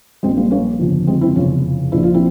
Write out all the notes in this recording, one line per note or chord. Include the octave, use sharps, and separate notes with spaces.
A#1 A#2 F3 G#3 C4
G3 A#3
A#3 C#4
G1 F2 C#3 F3
G#3 C4
C4 E4
F1 E2 C#3 C#4 F4
A#1 A#2 F3 E4
F4
C4 E4